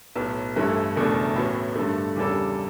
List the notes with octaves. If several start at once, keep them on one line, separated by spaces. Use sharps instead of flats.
B1 A2 F#3 B3
G1 G2 E3 A3 E4
F#1 E2 B2 A3 D4
A1 A2 E3 B3 F#4
G2 D3 A3
E2 C#3 G3 D4 A4